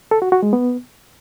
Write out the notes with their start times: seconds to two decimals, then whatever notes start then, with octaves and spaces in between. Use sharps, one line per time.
0.11 A4
0.22 F#4
0.32 F#4
0.42 G#3
0.53 B3